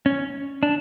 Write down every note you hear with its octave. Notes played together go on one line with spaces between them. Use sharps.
C#4
D4